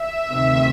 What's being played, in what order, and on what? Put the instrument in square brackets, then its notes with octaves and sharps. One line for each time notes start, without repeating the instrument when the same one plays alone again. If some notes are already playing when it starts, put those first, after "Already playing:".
Already playing: [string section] E5
D2 C3 D#3